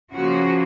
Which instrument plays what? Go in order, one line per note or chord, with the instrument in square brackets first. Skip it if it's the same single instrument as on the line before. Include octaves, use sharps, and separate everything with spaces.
[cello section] C#3 F3 A#3 F#4